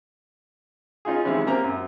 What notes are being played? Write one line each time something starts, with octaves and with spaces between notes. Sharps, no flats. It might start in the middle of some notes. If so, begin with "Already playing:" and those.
C#4 D#4 F4 G#4
C3 D#3 E3 G#3 C#4
A#3 C4 C#4 G4 G5 A#5
F#2